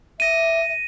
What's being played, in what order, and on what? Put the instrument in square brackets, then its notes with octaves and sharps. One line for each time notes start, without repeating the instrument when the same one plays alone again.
[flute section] E5 [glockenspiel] A#6 D#7